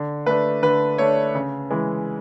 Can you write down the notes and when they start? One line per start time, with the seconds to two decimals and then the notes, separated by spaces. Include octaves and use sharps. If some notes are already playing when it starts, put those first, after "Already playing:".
Already playing: D3
0.26 A3 D4 B4
0.63 D3 B4
0.98 A3 D4 C#5
1.35 C#3
1.71 E3 G#3